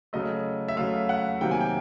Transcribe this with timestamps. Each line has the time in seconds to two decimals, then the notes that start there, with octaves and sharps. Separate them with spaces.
0.13 C#3 F#3 A3 D#5
0.68 E5
0.77 C#3 F#3 A3 F5
1.09 F#5
1.41 C3 D#3 F#3 A#3 G5
1.51 G#5
1.61 G5